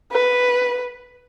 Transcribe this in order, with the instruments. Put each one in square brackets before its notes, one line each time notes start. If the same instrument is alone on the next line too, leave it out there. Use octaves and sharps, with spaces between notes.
[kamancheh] B4